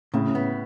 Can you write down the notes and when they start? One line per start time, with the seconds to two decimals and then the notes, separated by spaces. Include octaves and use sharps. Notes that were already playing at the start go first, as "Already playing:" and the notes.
0.14 A2 C#3
0.35 B3